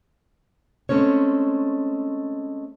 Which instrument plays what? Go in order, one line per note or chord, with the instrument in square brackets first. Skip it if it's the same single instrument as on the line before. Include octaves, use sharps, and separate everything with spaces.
[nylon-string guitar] G#3 A3 C4 C#4 C#5